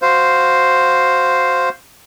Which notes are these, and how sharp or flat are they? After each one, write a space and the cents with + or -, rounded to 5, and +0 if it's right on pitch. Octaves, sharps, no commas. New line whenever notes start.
F#4 +0 C5 +0 F5 +0